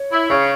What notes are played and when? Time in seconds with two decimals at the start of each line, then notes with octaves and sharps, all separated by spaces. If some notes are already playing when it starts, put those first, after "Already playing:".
Already playing: C#5
0.11 E4
0.29 C#3 C#5